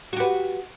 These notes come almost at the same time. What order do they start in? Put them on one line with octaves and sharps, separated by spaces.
F#4 G4 B4